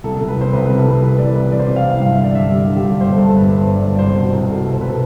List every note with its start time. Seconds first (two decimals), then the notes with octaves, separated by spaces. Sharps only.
0.04 C2 A4
0.16 C2 A4
0.28 B4
0.37 C2 C5
0.53 C2 B4
0.66 C3 B4
0.78 A4
0.87 C2 B4
1.02 C2 B4
1.18 E3 D5
1.35 C2 B4
1.52 E3 D5
1.59 C5
1.67 C3 D5
1.76 F5
1.85 C3
2.01 G2 F5
2.12 E5
2.17 D3
2.24 D5
2.34 G2 E5
2.51 D3 G4
2.67 D3
2.76 G4
2.84 G2
3.00 G1 C5
3.13 A4
3.17 G2
3.25 A4
3.33 G1 B4
3.50 G1 C5
3.66 G1
3.75 D5
3.83 G2
3.95 D5
3.99 C2 C5
4.16 B2
4.32 C2
4.48 B2 A4
4.65 C2
4.73 C5
4.81 B2 B4
4.89 A4